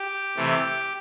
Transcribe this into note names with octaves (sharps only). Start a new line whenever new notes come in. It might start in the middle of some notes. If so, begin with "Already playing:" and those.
Already playing: G4
C3 E3 A3